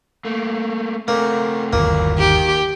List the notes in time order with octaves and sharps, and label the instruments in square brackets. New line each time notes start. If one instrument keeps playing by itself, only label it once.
[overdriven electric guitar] A3 A#3
[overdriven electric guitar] A3 C4 [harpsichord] A#3
[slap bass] G1 D#2 [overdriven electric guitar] E3 F#3 [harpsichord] A#3
[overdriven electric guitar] D#3 [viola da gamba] G4